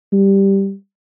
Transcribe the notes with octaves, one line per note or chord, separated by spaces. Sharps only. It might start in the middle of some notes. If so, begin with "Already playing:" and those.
G3